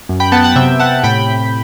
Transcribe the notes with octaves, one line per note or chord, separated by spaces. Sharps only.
F#2
G5 B5
B3 F#5 A5
F#5 A5
C3 E5 G5
C3 F#5 A5
A2 G5 B5
A2